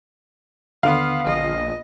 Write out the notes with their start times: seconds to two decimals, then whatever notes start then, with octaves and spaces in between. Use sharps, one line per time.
0.83 D#2 D3 B3 F5 C6
1.26 A#1 D#5